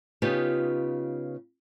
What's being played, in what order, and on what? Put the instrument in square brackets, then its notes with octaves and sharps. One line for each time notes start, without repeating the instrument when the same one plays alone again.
[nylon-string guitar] C#3 B3 D#4 F4 G4